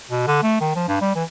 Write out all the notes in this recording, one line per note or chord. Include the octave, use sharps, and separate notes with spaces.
B2
D3
A3
D#3
F3
G2
G3
E3